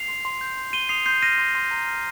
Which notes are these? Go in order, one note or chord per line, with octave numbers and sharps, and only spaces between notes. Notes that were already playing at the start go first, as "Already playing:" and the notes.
Already playing: C7 F7
C6
C6
G6
C6
C6 D#7 G7
D#6 C7 F7
C6 G6 C7
F6 A#6 D#7
C6
C6
A#5
F6